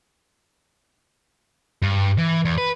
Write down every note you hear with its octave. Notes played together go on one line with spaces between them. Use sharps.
G2
E3
E2
B4